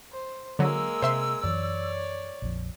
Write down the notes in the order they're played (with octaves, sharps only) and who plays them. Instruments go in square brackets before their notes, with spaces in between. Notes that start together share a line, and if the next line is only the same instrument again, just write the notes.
[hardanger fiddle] C5
[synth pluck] D3 F#3 [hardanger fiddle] G#3 A#3 [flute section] E6
[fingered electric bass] C3 [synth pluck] C5 E5 C6
[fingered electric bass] F#2 E3 F#3 [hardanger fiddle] C#5 D5
[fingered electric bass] A#1 F2